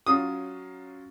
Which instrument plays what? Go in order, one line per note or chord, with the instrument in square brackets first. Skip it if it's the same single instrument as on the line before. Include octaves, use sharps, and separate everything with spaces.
[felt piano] F#3 C#4 F4 [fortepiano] D#6